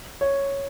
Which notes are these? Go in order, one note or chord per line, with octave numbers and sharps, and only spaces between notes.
C#5